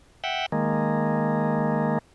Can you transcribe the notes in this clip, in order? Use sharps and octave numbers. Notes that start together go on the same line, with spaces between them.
E5 F#5 G5
D#3 G#3 A#3